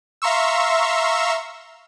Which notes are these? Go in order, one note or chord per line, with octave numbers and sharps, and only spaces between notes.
E5 F5 A#5 C6 C#6 E6